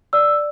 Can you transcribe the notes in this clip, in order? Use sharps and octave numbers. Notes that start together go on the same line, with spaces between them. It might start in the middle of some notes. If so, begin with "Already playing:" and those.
D5 E6